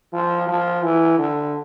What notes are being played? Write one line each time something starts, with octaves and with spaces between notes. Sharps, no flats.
F3
F3
E3
D3